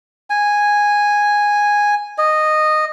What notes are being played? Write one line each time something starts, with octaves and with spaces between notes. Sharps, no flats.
G#5
D#5